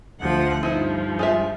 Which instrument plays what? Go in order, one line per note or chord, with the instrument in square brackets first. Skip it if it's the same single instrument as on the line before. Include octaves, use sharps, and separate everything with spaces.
[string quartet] D2 F3 F#5
[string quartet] G2 F3 [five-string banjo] D#4 E4 C5
[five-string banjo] G#3 F4 E5